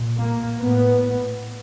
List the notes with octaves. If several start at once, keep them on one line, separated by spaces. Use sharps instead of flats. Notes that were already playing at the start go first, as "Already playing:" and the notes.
Already playing: A#2
A#3
A2 B3